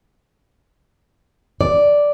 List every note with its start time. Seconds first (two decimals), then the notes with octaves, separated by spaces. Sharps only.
1.61 D5